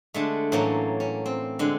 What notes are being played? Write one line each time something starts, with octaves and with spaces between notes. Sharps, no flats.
D3 G#3 A3
A2 E3 F#3 A#3 C#4
C#4
C4
D3 G#3